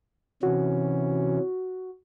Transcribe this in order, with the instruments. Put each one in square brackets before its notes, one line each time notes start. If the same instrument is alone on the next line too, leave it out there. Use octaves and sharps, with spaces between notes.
[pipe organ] C3 E3 C#4 [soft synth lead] F#4